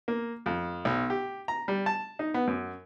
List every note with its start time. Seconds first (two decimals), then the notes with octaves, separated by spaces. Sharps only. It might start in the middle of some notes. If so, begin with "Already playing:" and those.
0.08 A#3
0.46 F2
0.85 B1
1.10 G4
1.48 A#5
1.68 G3
1.86 A5
2.19 D#4
2.34 B3
2.47 F#2